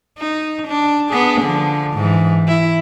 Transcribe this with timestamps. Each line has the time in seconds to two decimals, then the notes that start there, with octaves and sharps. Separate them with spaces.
0.19 D#4
0.67 D4
1.09 B3 D4 G#4
1.42 D3 F3
1.94 G#2 E3
2.48 E4